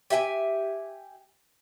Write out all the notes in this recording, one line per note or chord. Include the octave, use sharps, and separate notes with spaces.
G4 E5 G5 G#5